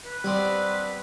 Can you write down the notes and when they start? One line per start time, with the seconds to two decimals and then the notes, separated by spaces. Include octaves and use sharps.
0.05 B4
0.24 G3 B3 C4 D4